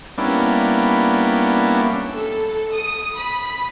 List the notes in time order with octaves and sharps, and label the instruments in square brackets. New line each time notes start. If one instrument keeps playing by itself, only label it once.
[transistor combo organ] G3 A#3 B3 C#4 D4 E4
[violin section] A4
D#6
B5